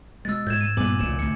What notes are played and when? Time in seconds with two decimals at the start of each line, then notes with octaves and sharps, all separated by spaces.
0.25 B2 G#3 E6 A6
0.47 G#2 G6 G#6 E7
0.61 D#7 E7
0.77 G2 A#2 B3 G#5 D6 F#7
0.99 F1 C#2 F#2 A#2 E7
1.19 D2 G#2 C3 C#7